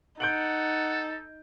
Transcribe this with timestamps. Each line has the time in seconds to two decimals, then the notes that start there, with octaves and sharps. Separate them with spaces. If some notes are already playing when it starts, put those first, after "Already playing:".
0.20 D#4 A4 F#5 G6 D7 F#7